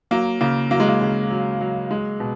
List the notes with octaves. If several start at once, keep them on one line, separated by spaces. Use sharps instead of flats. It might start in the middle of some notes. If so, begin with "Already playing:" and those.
F#3 A#3
C#3 A#3
F#3 A#3
G#3
A#3
C#3
F#3
F#3
G#3
B2